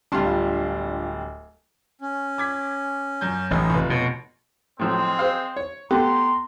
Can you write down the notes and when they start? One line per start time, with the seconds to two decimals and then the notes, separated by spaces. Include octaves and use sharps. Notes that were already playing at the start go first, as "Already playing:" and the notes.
0.12 D1 G3 D4 F4 C6
2.01 C#4
2.38 D6 G#6 B6
3.21 F#2 G6
3.51 A1 D#4 C#5
3.70 F1 F4 B4
3.90 B2 C#5
4.79 A2 F3 F#3 G#3 C4
5.19 G#4 C5 F5
5.56 C#5
5.91 A3 B3 G4 A#5 C6